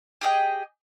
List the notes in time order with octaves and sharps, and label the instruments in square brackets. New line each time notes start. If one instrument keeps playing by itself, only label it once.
[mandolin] G4 G#4 D#5 G5